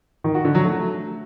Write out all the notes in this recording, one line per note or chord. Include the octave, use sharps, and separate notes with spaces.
D#3
F#4
D3
F#3
A3